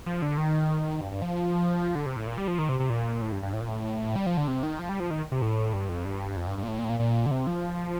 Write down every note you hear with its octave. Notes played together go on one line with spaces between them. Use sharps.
F3
D3
D#3
G2
G2
F3
D3
C3
A2
A#2
G3
F3
D#3
C3
C3
A#2
A2
G2
G2
A2
A#2
A2
G3
F3
D3
C3
D#3
F3
G3
F3
D#3
C3
A2
G2
F2
G2
F2
G2
G2
A#2
A2
A#2
A2
A#2
A#2
D3
C3
F3